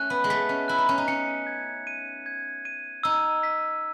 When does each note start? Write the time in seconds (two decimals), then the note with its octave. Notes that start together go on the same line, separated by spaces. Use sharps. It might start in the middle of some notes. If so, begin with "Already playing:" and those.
Already playing: A3 C#4 F#6
0.10 B3
0.24 G#3
0.30 A3 B6
0.49 C#4
0.68 E4 F#6
0.78 D#4
0.89 C#4
0.98 D#4
1.08 C#4 C#7
1.47 G#6
1.87 D#7
2.26 G#6
2.65 D#7
3.03 D#4 E6
3.43 B6